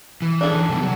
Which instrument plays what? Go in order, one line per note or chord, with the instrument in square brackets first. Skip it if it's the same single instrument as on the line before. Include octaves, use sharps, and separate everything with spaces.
[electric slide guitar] E3
[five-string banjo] D4 G#4 A4
[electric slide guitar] D3 E3
C3 G3 B3
F#3